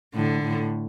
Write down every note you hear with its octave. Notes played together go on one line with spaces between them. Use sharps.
A2 D3
A2